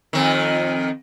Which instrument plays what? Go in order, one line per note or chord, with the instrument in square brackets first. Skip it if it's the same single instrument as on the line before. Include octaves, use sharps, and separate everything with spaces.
[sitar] F2 D#3